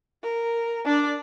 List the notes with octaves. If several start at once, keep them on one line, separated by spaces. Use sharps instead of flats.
A#4
D4 D5